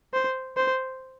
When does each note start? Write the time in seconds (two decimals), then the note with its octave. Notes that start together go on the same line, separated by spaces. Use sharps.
0.14 C5
0.57 C5